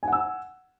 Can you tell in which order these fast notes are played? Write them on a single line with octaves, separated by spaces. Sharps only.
G#5 F#5 E6